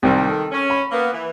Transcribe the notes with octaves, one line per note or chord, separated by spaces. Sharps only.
C2 D#3 G3 C4
A4
C#4
B5
A#3 B3
E3